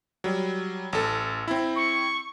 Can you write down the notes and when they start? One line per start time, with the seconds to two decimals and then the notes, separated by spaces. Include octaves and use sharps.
0.24 F#3 G3
0.93 A1 A4
1.48 C4 E4
1.76 C#6